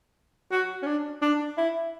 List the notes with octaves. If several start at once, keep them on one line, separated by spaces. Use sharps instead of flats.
F#4
C#4
D4
D4
E4